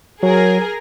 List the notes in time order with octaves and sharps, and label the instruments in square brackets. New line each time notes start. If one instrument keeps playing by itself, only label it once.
[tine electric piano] F#3 [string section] G#4 A#4